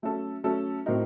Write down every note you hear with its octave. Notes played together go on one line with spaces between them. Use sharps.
F#3 A3 C#4 A4
F#3 A3 C#4 A4
A2 F#3 C4 D#4 A#4